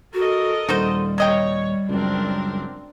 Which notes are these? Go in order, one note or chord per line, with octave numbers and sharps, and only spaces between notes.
F#4 A4 A#4 D#5
D#1 G3 D#4 F#4 C5
F#3 C#5 D#5 G5
C#2 F#2 C4 D4 A#4